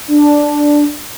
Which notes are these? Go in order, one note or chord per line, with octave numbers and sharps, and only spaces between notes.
D4